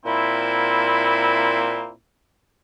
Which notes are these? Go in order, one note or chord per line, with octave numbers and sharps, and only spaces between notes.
A#2 A#3 C4 E4